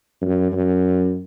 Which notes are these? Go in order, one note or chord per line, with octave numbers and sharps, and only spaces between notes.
F#2
F#2